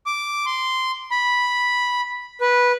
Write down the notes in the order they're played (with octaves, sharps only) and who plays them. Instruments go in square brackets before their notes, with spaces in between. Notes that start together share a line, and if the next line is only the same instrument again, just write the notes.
[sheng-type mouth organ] D6
C6
B5
B4